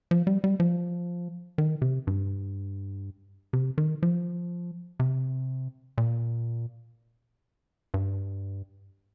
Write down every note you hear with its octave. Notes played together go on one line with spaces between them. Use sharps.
F3
G3
G3
F3
D#3
C3
G2
C3
D#3
F3
C3
A#2
G2